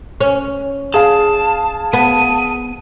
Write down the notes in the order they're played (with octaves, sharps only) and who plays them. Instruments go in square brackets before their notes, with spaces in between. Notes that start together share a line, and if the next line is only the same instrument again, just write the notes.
[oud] C#4
[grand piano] G#4 F5 [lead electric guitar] A5
[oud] B3 [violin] D#7